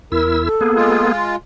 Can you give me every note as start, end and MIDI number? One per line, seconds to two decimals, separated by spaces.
0.12 0.49 40
0.12 0.49 64
0.12 0.43 70
0.12 0.49 88
0.45 1.10 69
0.61 1.12 58
0.61 1.12 59
0.61 1.12 68
0.76 1.36 56
0.76 1.36 65